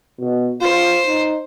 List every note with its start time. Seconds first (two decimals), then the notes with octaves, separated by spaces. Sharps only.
0.19 B2
0.61 F4 C5
1.07 D#4